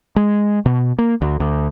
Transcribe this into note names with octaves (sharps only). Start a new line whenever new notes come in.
G#3
B2
A#3
D2
D2